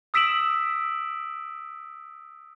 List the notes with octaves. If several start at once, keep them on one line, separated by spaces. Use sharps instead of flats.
D#6 E6 B6 D7 E7 F#7